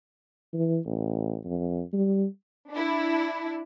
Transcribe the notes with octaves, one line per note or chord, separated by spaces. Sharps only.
E3
A1
F2
G3
D4 E4